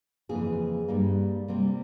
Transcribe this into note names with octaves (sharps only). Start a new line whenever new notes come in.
F2 C#3 E3 A#3 G#4
G2 G3 A#3
C3 G3 A#3